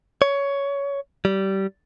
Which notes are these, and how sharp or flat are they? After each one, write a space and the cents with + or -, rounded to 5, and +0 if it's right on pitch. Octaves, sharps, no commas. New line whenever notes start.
C#5 +15
G3 -20